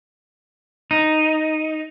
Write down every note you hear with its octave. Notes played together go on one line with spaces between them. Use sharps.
D#4